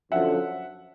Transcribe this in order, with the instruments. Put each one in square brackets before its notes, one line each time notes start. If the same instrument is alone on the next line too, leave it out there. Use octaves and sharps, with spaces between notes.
[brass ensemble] F#2 D3 F3 [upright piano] E5 F#5